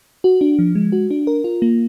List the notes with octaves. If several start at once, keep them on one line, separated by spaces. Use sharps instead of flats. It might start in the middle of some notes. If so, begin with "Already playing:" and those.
F#4
D4
F3
G#3
F#4
D4
A#4
F4
A#3